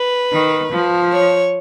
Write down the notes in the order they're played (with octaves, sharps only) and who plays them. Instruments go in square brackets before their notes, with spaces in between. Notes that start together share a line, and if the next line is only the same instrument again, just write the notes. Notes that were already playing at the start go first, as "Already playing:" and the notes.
Already playing: [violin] B4
[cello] D#3
F3
[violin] C#5